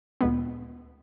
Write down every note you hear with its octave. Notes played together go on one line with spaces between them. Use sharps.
D2 A#2 G#3 B3